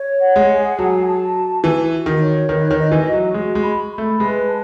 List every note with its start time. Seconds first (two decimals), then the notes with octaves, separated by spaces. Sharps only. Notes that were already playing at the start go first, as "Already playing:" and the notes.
Already playing: C#5
0.21 F#5
0.36 G#3
0.50 G#4
0.78 F#3 A5
1.06 A5
1.35 F#4
1.63 E3 F#4
1.92 F#4
2.06 D#3
2.20 C#5
2.49 D#3 B4
2.71 D#3
2.77 D#5
2.92 E3
3.06 F#4
3.13 F#3
3.34 G#3 F#4
3.55 G#3
3.63 B5
3.91 B5
3.98 A3
4.20 G#3 B4
4.48 A5